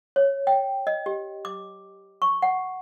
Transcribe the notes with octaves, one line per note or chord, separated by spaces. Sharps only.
C#5
G5
D#5
G4
D6
C#6
F#5